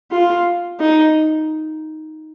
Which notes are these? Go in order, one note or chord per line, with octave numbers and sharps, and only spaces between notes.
F4
D#4